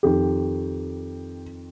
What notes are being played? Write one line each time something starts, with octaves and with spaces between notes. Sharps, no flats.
F2 D#3 G4